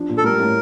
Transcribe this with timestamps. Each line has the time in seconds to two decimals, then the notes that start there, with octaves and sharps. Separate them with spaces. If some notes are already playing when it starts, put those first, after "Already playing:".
Already playing: F3 D4
0.09 A#2
0.18 A4
0.24 G3 A#4
0.40 A2